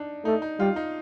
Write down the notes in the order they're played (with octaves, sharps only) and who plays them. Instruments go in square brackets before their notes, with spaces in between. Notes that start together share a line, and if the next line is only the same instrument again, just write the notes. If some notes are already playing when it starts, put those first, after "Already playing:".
Already playing: [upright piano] D4 D#4
[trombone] A3 [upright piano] D#4
[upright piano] D#4
[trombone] G3 [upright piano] F4
[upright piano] D#4